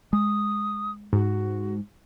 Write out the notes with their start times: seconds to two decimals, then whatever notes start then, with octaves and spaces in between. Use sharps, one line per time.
0.13 G#3 D#6
1.13 G#2 F#4